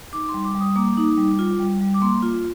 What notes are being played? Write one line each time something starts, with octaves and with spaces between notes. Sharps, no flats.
D#4 D6
C6
G3
D6
G3
D#6
A#3 D6
D#4
G3
F4
G3
G3
D6
A#3 C6
F4